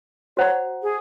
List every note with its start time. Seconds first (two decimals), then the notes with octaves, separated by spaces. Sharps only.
0.37 F#4 C5 C#5 F#5 A#5
0.83 G#4